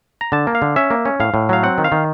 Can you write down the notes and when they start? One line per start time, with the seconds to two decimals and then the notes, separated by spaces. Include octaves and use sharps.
0.21 A#5
0.32 D3 A5
0.47 A#3
0.55 F5
0.62 D3
0.76 C#4 E5
0.90 A#3
1.05 C#4
1.20 A2 F5
1.34 A2
1.49 F#3 F5
1.63 C4 F#5
1.78 D#3
1.84 F5
1.92 D#3